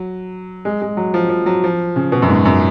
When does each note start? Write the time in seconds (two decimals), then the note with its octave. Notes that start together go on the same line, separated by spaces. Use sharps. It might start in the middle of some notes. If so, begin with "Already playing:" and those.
Already playing: F#3
0.65 G#3
0.82 G#3
0.97 F#3
1.14 F3
1.30 F3
1.46 F#3
1.64 F3
1.96 C#3
2.12 B2
2.22 F#2
2.29 G#2
2.45 F#2